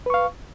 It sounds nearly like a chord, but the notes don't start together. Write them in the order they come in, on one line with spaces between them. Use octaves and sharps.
B4 C#6 F5